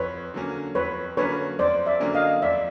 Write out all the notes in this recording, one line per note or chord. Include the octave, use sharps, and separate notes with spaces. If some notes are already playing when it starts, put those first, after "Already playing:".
Already playing: F2 B4 C#5
D3 F#3 A#3 C#4
F2 B4 C#5
D3 F#3 A#3 C#4 B4 C#5
F2 C5 D5
D5 E5
D3 F#3 A#3 C#4
D#5 F5
F2 D5 E5